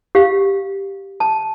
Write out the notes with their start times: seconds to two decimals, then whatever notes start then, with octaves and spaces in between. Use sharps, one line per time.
0.15 G4 F5
1.20 A5